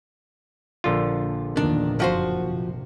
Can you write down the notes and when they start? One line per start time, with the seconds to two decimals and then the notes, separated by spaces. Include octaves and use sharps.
0.84 A#1 D3 F4
1.57 E2 A#2 D#3 D4
2.00 F#1 F2 F3 F#4 C5
2.45 C3